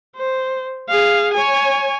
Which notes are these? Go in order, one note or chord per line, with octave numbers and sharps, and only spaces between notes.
C5
G#4 F5
C#5 G#5